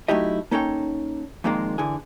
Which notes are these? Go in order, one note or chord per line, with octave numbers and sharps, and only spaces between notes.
F#3 A3 D#4 E4 G4 D#5
A#3 C#4 D#4 A4 C#5 G5
F2 A#2 D#3 G#3 A#3
D3 E3 G#4